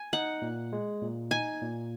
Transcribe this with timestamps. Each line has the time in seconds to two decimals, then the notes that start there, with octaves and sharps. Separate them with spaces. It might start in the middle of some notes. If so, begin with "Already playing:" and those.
Already playing: G#5
0.13 D#4 F#5
0.42 A#2
0.73 G#3
1.02 A#2
1.31 D#4 G#5
1.62 A#2